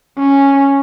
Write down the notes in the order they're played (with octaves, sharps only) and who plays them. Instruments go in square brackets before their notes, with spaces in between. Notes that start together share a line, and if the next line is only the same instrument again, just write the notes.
[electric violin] C#4